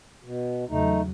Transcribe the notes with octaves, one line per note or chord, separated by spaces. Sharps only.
B2
E2 C#3 F#3 A3 D#4